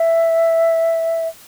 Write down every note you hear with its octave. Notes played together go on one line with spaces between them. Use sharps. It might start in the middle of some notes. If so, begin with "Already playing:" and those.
Already playing: E5